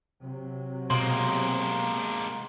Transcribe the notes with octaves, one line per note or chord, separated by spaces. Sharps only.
C3 F#3
B2 G#3 A#3 C5 C6